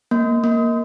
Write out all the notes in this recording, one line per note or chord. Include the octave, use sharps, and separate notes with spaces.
A#3
A#3